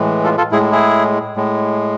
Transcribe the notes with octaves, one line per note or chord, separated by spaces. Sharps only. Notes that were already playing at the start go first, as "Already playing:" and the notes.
Already playing: A2 E3 G#3
F4 A4
F4 A4
A2 G#3 E4 G#4
E4 G#4
A2 G#3